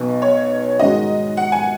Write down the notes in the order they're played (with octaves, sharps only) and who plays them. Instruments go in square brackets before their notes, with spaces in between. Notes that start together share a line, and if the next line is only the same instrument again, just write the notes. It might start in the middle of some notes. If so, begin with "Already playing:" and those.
Already playing: [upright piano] B1 B2 B3
[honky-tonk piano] C#5
[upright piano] G#2 D#3 G#3 D#4 F#4 [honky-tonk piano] D#5
[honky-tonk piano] F#5
G#5